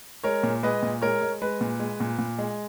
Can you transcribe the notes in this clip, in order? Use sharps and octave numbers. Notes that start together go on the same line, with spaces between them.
G#3 A#4 C#5
A#2
G#3 B4 D#5
A#2
G#3 A#4 C#5
G#3
G#3 B4
A#2
G#3
A#2
A#2
G#3